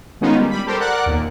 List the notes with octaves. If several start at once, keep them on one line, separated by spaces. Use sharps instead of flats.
D#3 G#3 B3 C#4 D#4 F4
G3
G3 B5
G4 A4 A#4 C5
A#4 D5 F#5 F#6
D#2 A#2